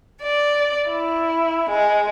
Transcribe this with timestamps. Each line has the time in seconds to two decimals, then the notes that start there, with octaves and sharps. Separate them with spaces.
0.21 D5
0.88 E4
1.69 G#3